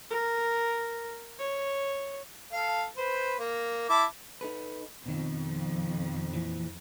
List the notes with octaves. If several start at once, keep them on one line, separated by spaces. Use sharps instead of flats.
A#4
C#5
A4 F5
B4 C5
A#3
E4 A5 D6
D#4 A4 B4
F2 B2 D#3
A#2 E3 F3